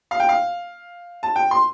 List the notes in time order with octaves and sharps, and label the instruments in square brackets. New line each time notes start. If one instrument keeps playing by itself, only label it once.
[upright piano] F5
G5
F5
A5
G5
C6